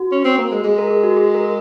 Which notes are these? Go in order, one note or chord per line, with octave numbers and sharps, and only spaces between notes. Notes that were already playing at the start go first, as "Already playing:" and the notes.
Already playing: F#4
C#4
C4
A#3
G#3
G#3 G#4
A#4
G#4
F#4
G#4
A#4